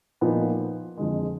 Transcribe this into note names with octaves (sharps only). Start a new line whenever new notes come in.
A#2 F3 B3 D#4
F2 D3 G#3